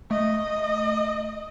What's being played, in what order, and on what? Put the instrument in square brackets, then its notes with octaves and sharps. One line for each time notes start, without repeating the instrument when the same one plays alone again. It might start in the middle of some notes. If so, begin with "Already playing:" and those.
[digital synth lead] A3 [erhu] D#5